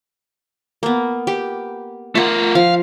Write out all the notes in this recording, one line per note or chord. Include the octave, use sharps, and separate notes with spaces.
A#3 B3
G4
A3 F4 A#4 F#5
F3 F5